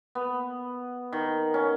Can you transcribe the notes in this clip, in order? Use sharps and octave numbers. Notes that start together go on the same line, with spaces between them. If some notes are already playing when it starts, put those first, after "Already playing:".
B3
D#3
C#4